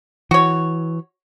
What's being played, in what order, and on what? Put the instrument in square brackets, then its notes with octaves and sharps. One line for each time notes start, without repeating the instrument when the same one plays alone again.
[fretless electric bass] E3 [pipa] F#4 C#5